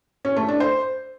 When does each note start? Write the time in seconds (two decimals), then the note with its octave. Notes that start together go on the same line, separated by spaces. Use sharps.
0.25 C#4
0.36 A3
0.48 D4
0.60 C5